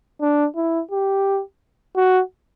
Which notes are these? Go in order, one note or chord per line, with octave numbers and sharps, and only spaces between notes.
D4
E4
G4
F#4